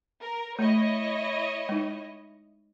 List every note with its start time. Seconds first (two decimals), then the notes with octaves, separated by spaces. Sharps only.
0.21 A#4
0.59 A3 E4 C#5 D#5
1.69 G#3 D#4